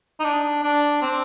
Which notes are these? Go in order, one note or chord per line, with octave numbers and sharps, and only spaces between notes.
D#4
D4
D4
C4